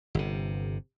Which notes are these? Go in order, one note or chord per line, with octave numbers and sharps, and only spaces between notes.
G1 C3